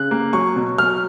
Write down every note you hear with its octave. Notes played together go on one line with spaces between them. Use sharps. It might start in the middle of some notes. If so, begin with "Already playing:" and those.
Already playing: C#3 F#6
A#3
F#3 C#6
B2
F#3 F6